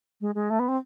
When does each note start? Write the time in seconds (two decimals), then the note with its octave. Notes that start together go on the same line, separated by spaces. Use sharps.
0.21 G#3
0.35 G#3
0.50 A3
0.59 B3
0.68 C4